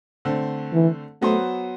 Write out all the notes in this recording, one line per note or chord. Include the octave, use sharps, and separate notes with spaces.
D3 A3 C4
E3
F#3 A3 B3 F#4 C5